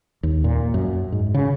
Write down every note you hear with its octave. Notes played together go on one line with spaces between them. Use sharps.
D#2
A#2
F#2
G#2
C#3